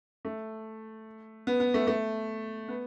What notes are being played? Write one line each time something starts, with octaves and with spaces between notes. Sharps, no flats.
A3
B3
B3
A3
A3
B3